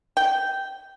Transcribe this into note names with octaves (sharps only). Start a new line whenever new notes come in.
G5